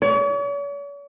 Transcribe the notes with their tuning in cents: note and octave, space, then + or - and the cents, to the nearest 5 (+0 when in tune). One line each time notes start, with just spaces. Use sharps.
C#5 +45